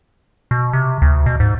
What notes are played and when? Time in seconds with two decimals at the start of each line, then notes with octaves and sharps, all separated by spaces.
0.51 B2
0.73 C3
1.02 D2
1.26 B2
1.40 G#2